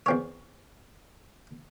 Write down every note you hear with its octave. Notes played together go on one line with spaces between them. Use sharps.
E2 C4 C#5